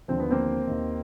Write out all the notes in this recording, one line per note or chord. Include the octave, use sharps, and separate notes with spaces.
D#2 D3 F3 C4
B3
A#3 C4
D#2 D#3